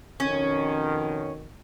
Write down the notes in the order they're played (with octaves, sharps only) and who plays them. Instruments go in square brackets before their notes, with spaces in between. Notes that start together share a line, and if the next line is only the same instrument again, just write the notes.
[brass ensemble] F2 B2 D#3 [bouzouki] C#4